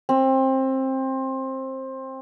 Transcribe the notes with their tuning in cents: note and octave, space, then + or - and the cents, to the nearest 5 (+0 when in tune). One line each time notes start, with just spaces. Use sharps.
C4 +20